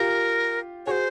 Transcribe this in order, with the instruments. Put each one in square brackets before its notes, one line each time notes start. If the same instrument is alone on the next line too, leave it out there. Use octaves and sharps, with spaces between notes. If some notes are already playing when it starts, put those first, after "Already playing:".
Already playing: [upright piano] F4 G4 [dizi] A#4
[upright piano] F#4 G#4 [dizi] C5 C#5